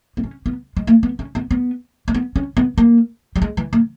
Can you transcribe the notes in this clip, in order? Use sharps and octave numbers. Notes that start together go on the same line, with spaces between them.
B3
C#4
B3
G#3
A#3
B3
C#4
B3
B3
A#3
B3
C#4
B3
A#3
G3
G#3
E3
A#3